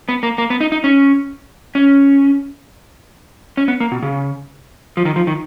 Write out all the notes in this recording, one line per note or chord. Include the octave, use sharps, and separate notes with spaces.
B3
A#3
A#3
B3
D#4
D#4
C#4
C#4
C#4
B3
A#3
B2
C#3
F3
D#3
F3
D#3